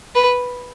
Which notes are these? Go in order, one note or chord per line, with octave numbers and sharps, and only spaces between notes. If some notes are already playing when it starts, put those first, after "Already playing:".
B4